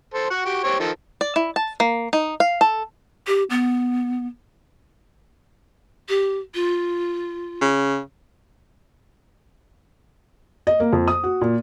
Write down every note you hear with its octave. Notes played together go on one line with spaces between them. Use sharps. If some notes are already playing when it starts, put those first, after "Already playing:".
A4 C5
F#4 F#5
F#4 G4
C4 G4 C#5
D#3 F3 A4
D5
E4
A5
A#3
D#4
F5
A4
G4
B3
G4
F4
C#3
D#5
A#3
F2
D#6
F#4
A#2